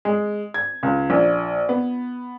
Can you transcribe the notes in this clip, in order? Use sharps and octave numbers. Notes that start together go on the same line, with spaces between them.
G#3
G#6
C#2
A#1
B3